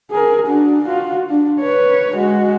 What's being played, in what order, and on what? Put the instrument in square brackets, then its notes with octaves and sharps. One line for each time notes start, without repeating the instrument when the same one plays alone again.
[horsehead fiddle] G#4 A#4
D4 F#4
F4 F#4
D4
B4 C#5
G#3 F#4